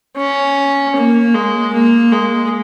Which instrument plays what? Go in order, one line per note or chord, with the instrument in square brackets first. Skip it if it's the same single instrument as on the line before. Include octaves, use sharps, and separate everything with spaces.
[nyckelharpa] C#4
A#3
G#3
A#3
G#3